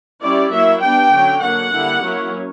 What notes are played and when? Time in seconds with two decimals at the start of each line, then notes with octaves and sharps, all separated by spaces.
0.22 G3 C#4 E4 D5
0.51 F#3 A#3 E4 E5
0.82 G3 B3 D4 G5
1.12 D3 F#3 C#4
1.43 D3 F#3 A#3 F#5
1.73 D3 G3 A#3 E4
2.03 F#3 A#3 C#4 E4